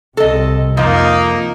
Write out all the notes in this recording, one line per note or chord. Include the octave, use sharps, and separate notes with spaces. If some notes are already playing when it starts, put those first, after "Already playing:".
C2 C3 A4 D#5
F2 F3 A#3 D#4 D#5